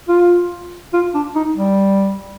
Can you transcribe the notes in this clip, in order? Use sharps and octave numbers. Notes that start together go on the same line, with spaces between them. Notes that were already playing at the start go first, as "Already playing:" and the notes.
F4
F4
D4
D#4
G3